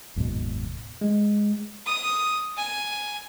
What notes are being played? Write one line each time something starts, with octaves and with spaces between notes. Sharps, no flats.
F#1 D#2 G#2 B2
G#3
D#6
G#5